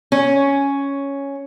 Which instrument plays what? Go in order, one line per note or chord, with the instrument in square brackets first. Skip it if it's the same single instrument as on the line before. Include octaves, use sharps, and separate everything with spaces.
[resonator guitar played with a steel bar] C#4